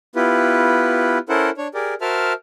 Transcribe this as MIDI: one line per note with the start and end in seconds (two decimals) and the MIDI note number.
0.16 1.18 59
0.16 1.18 64
0.16 1.18 65
0.16 1.18 67
0.16 1.18 71
1.29 1.50 61
1.29 1.50 64
1.29 1.50 69
1.29 1.50 70
1.29 1.50 72
1.29 1.50 78
1.58 1.68 62
1.58 1.68 73
1.74 1.94 67
1.74 1.94 68
1.74 1.94 70
1.74 1.94 74
2.01 2.33 66
2.01 2.33 70
2.01 2.33 72
2.01 2.33 76
2.01 2.33 81
2.01 2.33 89